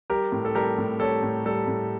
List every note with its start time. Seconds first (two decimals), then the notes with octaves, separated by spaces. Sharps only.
0.10 G3 G4 A#4
0.32 A2
0.45 A4
0.55 G3 G4 A#4
0.78 A2
1.00 G3 A4 C#5
1.23 A2
1.45 G3 A4
1.68 A2